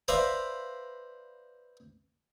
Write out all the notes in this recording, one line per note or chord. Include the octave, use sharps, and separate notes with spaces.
B4 C5 D5 E5 F5 A#5